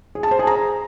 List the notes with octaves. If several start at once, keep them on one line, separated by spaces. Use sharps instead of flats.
G#4
A5
C5
G#4
A#5